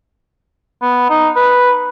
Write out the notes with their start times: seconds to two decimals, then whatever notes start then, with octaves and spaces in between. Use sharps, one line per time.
0.82 B3
1.10 D#4
1.36 B4